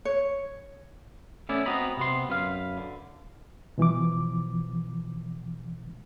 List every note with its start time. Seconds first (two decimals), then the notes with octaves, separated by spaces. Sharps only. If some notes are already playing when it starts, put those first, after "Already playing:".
0.05 C#5
1.49 A3 B3 C#4 E4 D5
1.66 B3 C4 F#4 D#5 A#5 B5
1.97 C3 B3 C6
2.29 F#2 B4 F5
2.77 D3
3.78 B2 E3 F3 D6